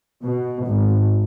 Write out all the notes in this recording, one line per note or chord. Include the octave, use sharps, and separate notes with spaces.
B2
G#1